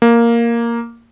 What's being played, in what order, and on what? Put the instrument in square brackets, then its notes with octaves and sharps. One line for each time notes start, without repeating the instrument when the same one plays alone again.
[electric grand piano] A#3